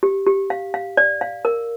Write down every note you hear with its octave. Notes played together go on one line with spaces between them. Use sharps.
G4
G4
F5
F5
D5
F5
A#4